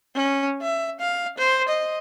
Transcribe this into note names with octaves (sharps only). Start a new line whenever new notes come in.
C#4
E5
F5
C5
D#5